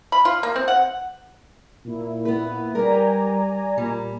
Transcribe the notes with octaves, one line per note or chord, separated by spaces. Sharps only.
B5
F4
A#3
C4
F#5
A#2 A#3 E4
B3 B4
G3 G4 A#4 D5 G#5 A#5
A#2 G3